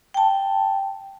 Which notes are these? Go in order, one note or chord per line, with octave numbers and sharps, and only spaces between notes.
G5 A5